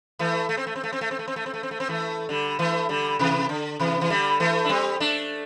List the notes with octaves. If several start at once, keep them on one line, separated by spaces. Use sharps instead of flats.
E3 A3
A3
C4
A3
C4
A3
C4
A3
C4
A3
C4
A3
C4
A3
C4
A3
C4
E3 A3
D3 G3
E3 A3
D3 G3
C3 E3
D3
C3 E3
E3
D3 G3
E3 A3
D4
G3 C4
A3 D4